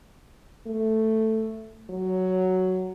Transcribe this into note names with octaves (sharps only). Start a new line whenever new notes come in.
A3
F#3